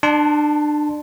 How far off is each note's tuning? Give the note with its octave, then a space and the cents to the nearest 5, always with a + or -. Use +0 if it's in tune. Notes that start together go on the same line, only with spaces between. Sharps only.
D4 +30 A5 +0 C6 +0